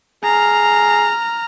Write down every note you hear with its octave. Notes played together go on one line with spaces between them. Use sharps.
G#4 A#5 F6